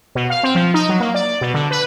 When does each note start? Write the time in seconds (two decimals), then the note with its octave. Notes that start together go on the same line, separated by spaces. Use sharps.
0.15 B2
0.30 F5
0.43 C4
0.55 F3
0.74 D#4
0.89 F#3
1.00 A#3
1.14 D5
1.41 B2
1.54 D3
1.71 B4